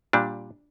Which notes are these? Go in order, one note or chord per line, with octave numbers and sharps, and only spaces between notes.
A#2 G3 D4